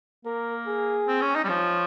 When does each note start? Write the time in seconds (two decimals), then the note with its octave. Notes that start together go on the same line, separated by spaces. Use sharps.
0.25 A#3 A#4
0.67 G#4
1.08 C4
1.22 C#4
1.35 D#4
1.44 G3
1.49 F3 C#5